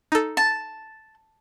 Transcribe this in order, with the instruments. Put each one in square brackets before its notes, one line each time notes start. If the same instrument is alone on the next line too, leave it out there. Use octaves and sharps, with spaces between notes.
[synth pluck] D#4 A4
[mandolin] A5